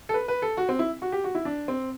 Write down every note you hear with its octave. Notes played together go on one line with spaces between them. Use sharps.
A4
B4
B4
A4
F#4
C4
E4
F#4
G4
F#4
E4
D4
C4